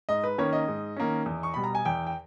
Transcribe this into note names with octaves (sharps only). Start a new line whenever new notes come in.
G#2 D#5
B4
D#3 A#3 C#4 C#5
D#5
G#2
D#3 A#3 C#4
E2
C#6
B2 G3 B5
A#5
G#5
E2 G5
G5